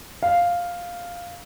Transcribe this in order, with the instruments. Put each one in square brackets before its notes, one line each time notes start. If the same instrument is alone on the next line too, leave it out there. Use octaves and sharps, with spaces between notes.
[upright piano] F5